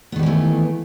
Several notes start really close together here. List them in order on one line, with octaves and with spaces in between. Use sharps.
B3 D#3 G3 E3 A3